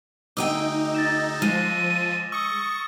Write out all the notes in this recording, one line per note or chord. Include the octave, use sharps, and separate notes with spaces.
D2 D#4 G#4 G5 D6 E6 D#7
A6 A#6 E7
F3 G#3 F6 A6 D#7
C#6 D#6 E6